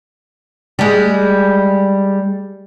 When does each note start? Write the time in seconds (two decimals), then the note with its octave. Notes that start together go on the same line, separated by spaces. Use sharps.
0.79 G3 G#3